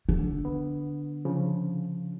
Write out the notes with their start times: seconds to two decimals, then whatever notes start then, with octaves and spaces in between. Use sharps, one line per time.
0.09 D3
0.45 B3
1.25 C#3 F3